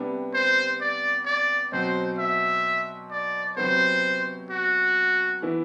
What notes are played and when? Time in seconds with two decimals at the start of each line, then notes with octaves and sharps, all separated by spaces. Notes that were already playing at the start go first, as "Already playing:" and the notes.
Already playing: C3 G3 B3 D4
0.34 C5
0.80 D5
1.26 D5
1.72 B2 F#3 C4 F#4 C5
2.18 E5
3.11 D5
3.57 C3 F#3 B3 C5
4.50 F#4
5.42 E3 B3 E4